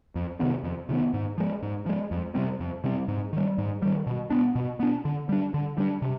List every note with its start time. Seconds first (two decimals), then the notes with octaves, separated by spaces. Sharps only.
0.15 F2
0.40 C3 D#3 B3
0.63 F2
0.89 C3 D#3 B3
1.14 G#2
1.38 F3 G#3
1.62 G#2
1.86 F3 G#3
2.11 F2
2.35 C3 G3 C4
2.60 F2
2.84 C3 G3 C4
3.08 G#2
3.33 D#3 G3
3.58 G#2
3.82 D#3 G3
4.07 B2
4.30 B3 D4
4.55 B2
4.80 B3 D4
5.05 D3
5.29 G3 D4
5.54 D3
5.78 G3 D4
6.02 C3